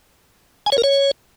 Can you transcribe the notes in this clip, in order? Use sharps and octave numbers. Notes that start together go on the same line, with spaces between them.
G#5
C#5
A#4
C#5